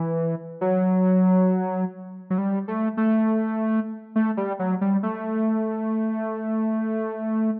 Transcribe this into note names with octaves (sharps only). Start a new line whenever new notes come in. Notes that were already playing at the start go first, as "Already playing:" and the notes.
Already playing: E3
F#3
F#3
G3
A3
A3
A3
G3
F#3
G3
A3